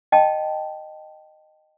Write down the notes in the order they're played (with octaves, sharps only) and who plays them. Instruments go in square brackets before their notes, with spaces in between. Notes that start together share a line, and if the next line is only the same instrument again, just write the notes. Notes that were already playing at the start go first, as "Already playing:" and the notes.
[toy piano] D#5 G5 A5